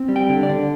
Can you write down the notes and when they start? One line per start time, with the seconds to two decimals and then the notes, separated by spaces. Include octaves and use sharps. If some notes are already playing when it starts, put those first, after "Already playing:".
Already playing: C4
0.09 G3
0.16 G5
0.29 D3
0.43 D5
0.49 D3